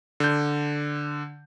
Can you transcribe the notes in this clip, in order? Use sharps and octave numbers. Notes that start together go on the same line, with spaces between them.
D3 G6